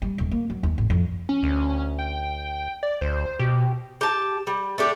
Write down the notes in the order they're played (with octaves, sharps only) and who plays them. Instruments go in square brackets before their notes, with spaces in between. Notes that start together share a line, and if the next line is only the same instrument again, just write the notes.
[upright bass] G3
D#1
A#3
F#3
D#2
A1
F2
[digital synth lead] C#4
[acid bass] D2
[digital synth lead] G5
D5
[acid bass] D2 [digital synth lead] C5
[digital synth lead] B2 [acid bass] G4
[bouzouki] G4 A5
G3
A3 D4 G4